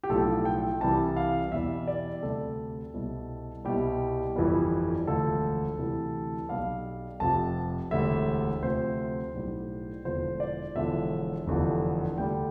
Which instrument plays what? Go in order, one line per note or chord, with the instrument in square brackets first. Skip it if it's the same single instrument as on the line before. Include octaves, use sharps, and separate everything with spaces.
[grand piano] G4
B1 A2 F3 A4
G5
C2 C3 E3 G3 A5
F5
E2 B2 G3 E5
D5
D2 C3 G3 A4
C2 B2 G3
C2 B2 G3 G4
G1 F2 E3 G3
E1 D2 D3 F3 A4
D2 C3 E3 G3
B1 B2 G3 F5
F1 F2 C3 F3 A5
E1 D2 D3 G3 E5
D2 C3 F3 C5
B1 A2 G3
E1 E2 D3 F3 C5
D5
E1 E2 D3 F3 E5
F1 E2 D3 F3
D2 D3 G3 G5